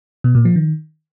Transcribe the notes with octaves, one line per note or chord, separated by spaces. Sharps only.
B2
A#2
F3
D#3